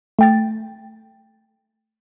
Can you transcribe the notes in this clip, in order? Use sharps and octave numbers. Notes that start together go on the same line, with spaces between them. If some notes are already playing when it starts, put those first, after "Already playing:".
A3 G5 A6